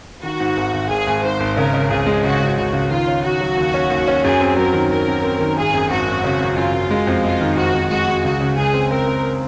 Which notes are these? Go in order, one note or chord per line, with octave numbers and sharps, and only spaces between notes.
D#3 F#4
G#2
G#1
G#1
G#1 G#4
G#1
G#2 C5
G#1
C#3 A#4
C#3
C#2 G#4
G#3
C#3 F#4
C#2
C#2 F#4
C#2
D#3 F4
C#4
D#3 F#4
F#3
D#2
C#4
D#2
C#4
F#2 G#4
C4
F#3 A#4
D#3
D#3 A#4
F#2
C4
D#3
G#1 G#4
F#2
G#1 F#4
F#2
C#3
F#2
F#2 F4
F#2
G#3
F2
G#3 F4
D#3
F2 F#4
F2
G#3 F#4
G#3
C#2 F#4
C#3
C#2 G#4
C4
C4 A#4
C4